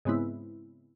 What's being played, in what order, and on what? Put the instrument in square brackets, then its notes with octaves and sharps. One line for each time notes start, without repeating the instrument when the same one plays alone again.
[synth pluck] G#2 C#3 G#3 B3 C4 E4